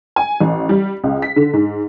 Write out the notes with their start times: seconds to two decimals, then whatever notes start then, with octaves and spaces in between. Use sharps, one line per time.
0.16 G#5
0.40 A1
0.69 G3
1.04 C#2
1.22 B6
1.36 D3
1.53 G#2